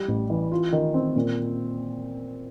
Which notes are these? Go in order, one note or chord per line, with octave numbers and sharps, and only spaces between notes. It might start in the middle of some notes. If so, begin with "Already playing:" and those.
Already playing: G3
A1
E3
F4
D#3
C4
A#2